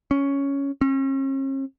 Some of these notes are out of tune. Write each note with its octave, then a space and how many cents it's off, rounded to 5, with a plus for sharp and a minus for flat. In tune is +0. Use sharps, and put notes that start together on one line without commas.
C#4 +5
C#4 -45